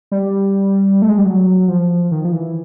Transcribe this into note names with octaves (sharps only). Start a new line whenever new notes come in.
G3
A3
G#3
G3
F#3
F3
D#3
F3
E3